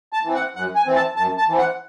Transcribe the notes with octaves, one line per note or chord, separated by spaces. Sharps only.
A5
E3 C4
F#5
F#2 F#5
G#5
E3 C4
A5
F#2 A5
A5
E3 C4
F#5